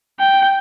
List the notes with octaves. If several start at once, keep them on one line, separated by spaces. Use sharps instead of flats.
G5